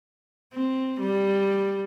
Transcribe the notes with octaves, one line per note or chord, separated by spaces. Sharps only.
C4
G3